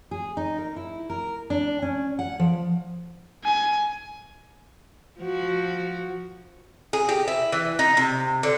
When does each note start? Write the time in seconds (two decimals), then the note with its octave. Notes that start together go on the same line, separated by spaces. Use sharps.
0.11 G#4
0.37 D#4
0.58 A#4
0.76 E4
1.10 A#4
1.50 D4
1.82 C#4
2.19 F#5
2.39 F3
3.44 G#5
5.21 F3 F#4
6.93 G#4
7.09 G4
7.28 E4
7.52 E3
7.79 D#4
7.97 C3
8.43 D3